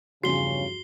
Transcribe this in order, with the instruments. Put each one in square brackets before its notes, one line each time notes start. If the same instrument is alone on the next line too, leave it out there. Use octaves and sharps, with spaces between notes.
[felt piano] E2 G2 F3 [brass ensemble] C#3 [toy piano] F#4 [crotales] C7 G7